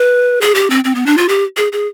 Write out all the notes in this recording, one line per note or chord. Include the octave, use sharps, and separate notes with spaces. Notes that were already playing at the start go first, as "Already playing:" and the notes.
Already playing: B4
G#4
G4
C4
C4
B3
D4
F4
G4
G#4
G#4